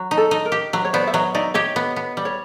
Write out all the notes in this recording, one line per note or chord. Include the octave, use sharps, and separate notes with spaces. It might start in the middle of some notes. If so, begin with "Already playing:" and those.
Already playing: F#3
D#4
A4
D#4
A#4
G4
F#3 B4
C#5
B3 C5 D5
E5
F#3 C#5 D#5
D#4 D5 E5
G4 C#5 D#5
B3
B3
G3
C#5